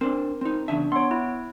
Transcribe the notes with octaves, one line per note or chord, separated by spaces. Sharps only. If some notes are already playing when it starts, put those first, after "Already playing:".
C4 D4 A#4
C4 D#4
E2 C#3 D4 E5
B3 C#5 C6
E4